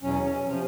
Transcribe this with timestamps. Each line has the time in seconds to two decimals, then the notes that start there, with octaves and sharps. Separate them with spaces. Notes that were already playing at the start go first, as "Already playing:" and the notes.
0.02 E2 B2 F#3 C#4
0.24 C#4
0.47 C3 F3 C#4